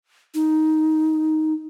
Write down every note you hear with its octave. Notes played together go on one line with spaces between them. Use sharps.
D#4